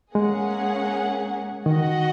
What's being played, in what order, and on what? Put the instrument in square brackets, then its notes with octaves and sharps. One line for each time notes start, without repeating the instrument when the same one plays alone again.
[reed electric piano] G#3 [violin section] A#3 C#4 G#4 F#5
[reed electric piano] D#3 [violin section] F#4 D#5 F#5